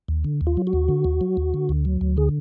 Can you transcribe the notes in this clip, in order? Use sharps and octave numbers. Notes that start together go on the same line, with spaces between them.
D#2
D3
D#2
F4
F#3
F#4
D#2
D3
D#2
F#3
D#2
D3
D2
F#3
D2
D3 G#4